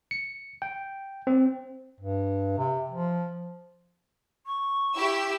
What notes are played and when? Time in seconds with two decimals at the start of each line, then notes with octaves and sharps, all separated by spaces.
0.11 C#7
0.62 G5
1.27 C4
2.01 G2
2.58 C3
2.90 F3
4.47 C#6
4.97 E4 G4 E6